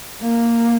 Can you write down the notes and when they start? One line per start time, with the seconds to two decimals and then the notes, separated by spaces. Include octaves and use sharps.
0.22 A#3